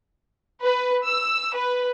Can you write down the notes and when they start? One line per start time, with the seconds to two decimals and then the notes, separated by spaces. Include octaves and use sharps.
0.62 B4
1.05 E6
1.54 B4